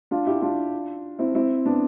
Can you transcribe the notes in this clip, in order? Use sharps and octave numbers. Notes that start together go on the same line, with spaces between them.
D4 F4
E4 G4
D4 F4
C4 E4
C4 E4
B3 D4